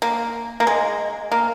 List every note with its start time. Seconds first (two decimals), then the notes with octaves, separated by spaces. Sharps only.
0.02 A#3
0.60 A#3
0.67 G#3
1.32 A#3